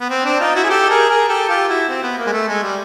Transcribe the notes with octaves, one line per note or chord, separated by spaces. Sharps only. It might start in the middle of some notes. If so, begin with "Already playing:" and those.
B3
C4
C4 D4
D#4 F4
E4 F#4
G#4
G4 A4
G#4 A#4
G#4 A#4
G4 A4
F4 G4
E4 F#4
C4
B3
A#3
G#3
A3
G#3
G3